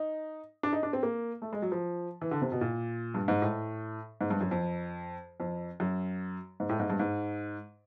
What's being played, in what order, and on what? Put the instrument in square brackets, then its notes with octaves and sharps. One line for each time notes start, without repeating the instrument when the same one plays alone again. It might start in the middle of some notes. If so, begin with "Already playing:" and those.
Already playing: [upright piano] D#4
D4
D#4
D4
C4
A#3
A3
G#3
F#3
F3
E3
D3
C3
B2
A#2
G2
G#2
A2
G#2
G2
F#2
F2
F2
F#2
G#2
A2
G#2
G2
G#2